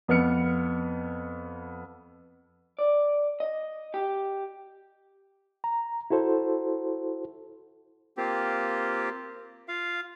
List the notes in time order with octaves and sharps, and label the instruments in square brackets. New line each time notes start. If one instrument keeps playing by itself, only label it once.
[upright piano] F2 B3 F6 C#7
[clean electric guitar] D5
D#5
G4
[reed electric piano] A#5
E4 F#4 A4 C5
[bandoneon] A#3 C4 F4 G4
F4 F5